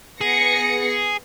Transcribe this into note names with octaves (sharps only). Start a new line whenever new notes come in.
B3 G#4 A#6 C#7